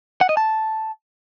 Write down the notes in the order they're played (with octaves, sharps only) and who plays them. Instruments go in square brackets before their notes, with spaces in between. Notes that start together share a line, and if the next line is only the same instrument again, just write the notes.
[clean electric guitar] F#5
D#5
A5